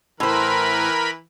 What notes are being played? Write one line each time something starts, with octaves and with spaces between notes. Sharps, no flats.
A2 E3 A#4 C5 B5